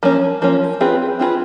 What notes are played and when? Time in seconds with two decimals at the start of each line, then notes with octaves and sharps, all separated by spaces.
0.03 F3 A#3 C#4
0.42 F3 A#3 C#4
0.81 C4 F4 G#4 B4
1.20 C4 F4 G#4 B4